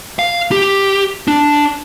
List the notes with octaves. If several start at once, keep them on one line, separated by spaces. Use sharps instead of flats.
F5
G4
D4